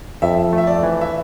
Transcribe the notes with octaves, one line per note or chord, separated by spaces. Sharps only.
F2 E5
A3
E5
D5
E3
E5